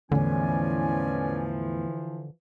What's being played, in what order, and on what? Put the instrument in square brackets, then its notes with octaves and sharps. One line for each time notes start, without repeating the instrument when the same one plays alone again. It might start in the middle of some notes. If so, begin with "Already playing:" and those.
[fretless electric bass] E2 A2 [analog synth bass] D3 [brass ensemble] E3 F3 [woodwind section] C#4 D5 G#5